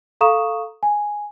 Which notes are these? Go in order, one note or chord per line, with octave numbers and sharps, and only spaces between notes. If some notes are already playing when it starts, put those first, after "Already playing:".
A4 F5 A#5 C#6 D#6 E7
G#5